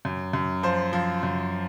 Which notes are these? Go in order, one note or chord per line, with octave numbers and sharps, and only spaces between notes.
F#2
F#2
F3 C5
F3
F#2